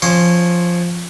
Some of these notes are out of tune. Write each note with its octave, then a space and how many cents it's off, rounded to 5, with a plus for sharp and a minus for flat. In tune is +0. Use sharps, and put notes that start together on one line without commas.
F3 +0 C#4 -15 C6 +0